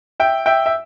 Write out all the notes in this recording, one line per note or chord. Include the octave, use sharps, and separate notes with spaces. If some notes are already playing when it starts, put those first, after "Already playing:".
E5 G5
E5 G5
E5